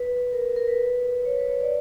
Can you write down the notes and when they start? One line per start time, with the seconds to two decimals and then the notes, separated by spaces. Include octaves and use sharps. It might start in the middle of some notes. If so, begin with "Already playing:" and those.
Already playing: B4
0.33 A#4
0.56 A#4
0.68 B4
1.25 C#5
1.38 B4
1.49 C#5
1.60 D5